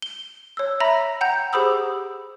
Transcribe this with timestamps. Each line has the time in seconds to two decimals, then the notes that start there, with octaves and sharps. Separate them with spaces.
0.02 G7
0.57 C#5 E6
0.80 E5 A#5 B5 A#6
1.21 F#5 G5 A#5 G6
1.53 G4 G#4 C5 B5 D#6 E6